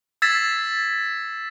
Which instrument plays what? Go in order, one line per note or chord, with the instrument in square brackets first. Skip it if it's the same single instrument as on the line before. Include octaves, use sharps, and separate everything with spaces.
[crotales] E6 G#6 A6 B6 C7 E7